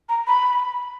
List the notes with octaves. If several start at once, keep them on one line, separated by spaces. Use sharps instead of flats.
A#5
B5